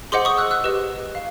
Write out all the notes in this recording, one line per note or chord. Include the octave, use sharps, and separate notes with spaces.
G#4 C5 D#5 F#5 C6 D6
C#6 D#6
E6 F#6
E6 F#6
G4 B4 D#5
F5